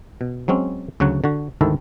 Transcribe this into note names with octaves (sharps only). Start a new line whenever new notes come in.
B2
F#3 G#3 C4 C#4
D2 C#3 F#3 F#4 F#5
D3 F#4
D2 G#2 D#3 E4 A4